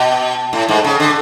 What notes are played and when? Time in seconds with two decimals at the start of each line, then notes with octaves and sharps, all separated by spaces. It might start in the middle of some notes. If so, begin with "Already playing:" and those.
Already playing: B2
0.53 A2
0.68 G#2
0.84 C#3
1.00 D3